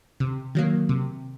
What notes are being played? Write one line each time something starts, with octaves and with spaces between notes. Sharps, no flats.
C3
D#3 F#3 A#3
C3